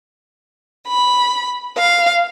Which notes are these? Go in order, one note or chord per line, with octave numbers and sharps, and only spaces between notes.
B5
F5